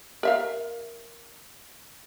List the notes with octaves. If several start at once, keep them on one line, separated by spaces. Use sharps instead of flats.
A#4 E5 F5